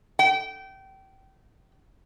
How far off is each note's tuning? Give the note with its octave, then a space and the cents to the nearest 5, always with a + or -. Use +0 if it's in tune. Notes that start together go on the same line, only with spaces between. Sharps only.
G5 -25